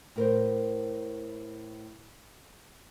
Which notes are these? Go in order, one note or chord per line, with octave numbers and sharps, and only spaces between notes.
A2 A#4 C5